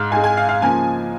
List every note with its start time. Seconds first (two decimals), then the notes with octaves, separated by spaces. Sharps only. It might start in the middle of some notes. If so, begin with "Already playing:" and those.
Already playing: G#2 G#3 F5
0.11 G#2 G#5
0.16 G#3
0.24 G#5
0.37 F5
0.49 F5
0.62 C#3 F3 A#3 G#5